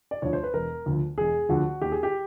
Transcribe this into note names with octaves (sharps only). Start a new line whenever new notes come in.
D5
D2 D3 F3 C#5
C5
B4
E1 A#4
D2 D3 F3
E1 G#4
D2 D3 F3 F#4
D#2 G4
G#4
G4